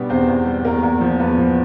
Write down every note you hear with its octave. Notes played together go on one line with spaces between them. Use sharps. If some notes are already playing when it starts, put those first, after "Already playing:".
Already playing: B2 G3 B3 D4
E2 C4 C5
E2
G3
E2 A#3 A#4
E2
F3
E2 B3 B4
F3